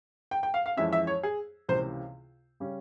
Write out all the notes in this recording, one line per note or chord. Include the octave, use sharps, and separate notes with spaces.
G5
G5
F5
F5
F2 E3 G#3 C#4 E5
E5
C#5
G#4
C#2 C3 E3 A#3 C#4 C5
C#3 G3 C#4